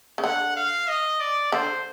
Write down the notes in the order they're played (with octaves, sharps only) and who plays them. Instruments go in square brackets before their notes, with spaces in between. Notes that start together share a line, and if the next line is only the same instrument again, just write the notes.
[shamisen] C#3
[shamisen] D3 [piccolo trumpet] F#5
[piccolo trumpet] F5
D#5
D5
[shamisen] D3 [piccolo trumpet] C5